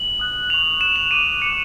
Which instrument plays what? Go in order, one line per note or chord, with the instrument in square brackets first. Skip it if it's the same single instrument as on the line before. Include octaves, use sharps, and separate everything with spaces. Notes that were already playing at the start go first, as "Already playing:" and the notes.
Already playing: [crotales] F#7
D#6 F#6
C#6 F#6 F7
C#6 F#6 E7
F7
D6 F#6 D#7
D6 F#6 C#7